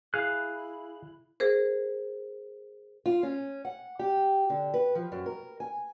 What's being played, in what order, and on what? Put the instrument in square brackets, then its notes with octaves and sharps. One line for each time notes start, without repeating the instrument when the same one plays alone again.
[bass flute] E4 [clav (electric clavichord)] G#4 F5 [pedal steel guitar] F#6
[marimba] G#4 A#4 C5
[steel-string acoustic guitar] F4
C#4
F#5
G4
D3
B4
F3
F#2
A#4
G#5